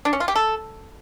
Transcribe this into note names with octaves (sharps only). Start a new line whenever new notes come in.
D4
C#4
F4
G4
A4